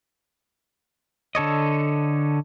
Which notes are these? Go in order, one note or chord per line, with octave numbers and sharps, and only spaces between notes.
D3 A4 C#5 D#5